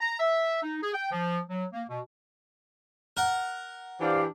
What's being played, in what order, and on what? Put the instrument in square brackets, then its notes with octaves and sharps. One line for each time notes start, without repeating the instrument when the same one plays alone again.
[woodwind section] A#5
E5
D#4
G#4
G5
F3
F#3
A#3
B2
[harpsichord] A#4 F#5
[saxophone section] E3 D4 G4 [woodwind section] C5 D5 F5